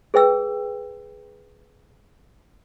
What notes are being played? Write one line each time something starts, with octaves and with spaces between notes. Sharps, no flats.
G#4 B4 G5 E6